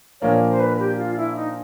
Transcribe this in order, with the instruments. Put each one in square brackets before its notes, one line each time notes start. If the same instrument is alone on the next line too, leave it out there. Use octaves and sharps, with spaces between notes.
[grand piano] A#2 F3 A#3 D4 [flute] C#5
[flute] C5
B4
G4
F4
E4
D#4